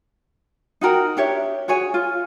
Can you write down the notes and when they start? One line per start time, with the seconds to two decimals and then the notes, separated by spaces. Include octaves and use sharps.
0.81 D#4 F#4 A#4 G5
1.17 D4 G4 C#5 E5
1.68 F#4 G#4 C#5 G#5
1.94 F4